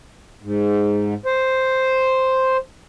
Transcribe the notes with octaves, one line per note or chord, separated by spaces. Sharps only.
G#2
C5